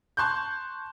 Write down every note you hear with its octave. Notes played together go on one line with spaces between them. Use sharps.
A5 C6 C#6 F#6 G6